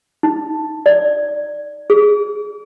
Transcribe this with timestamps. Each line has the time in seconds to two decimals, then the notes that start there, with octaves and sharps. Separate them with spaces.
0.23 D#4
0.86 D5
1.90 G#4